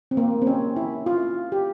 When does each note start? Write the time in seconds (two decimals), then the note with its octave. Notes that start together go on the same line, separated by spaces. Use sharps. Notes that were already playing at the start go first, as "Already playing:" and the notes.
0.11 C4
0.17 A#3
0.42 C4
0.47 C#4
0.76 E4
1.06 F4
1.52 G4